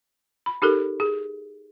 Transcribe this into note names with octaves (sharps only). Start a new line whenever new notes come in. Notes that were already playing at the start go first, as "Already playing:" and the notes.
B5
D#4 G4 A4 A#4
G#4